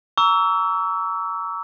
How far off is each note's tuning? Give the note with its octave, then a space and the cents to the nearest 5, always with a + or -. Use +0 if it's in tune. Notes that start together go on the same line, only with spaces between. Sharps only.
A#5 -5 C#6 +45 E6 -5